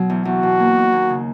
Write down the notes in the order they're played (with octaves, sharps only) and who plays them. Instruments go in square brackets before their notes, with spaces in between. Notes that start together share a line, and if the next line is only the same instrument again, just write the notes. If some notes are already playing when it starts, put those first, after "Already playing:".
Already playing: [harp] B2 F#3 C#4
E2
[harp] E2 [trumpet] F#4
[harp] B2
A#3
D#4
D#2
C#3